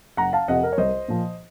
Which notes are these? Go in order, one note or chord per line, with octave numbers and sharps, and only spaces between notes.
F#1 F#5 A#5
F5 A5
F2 C3 F3 D#5 F#5
A#4
C#5
C2 C5 D#5
A#2 F3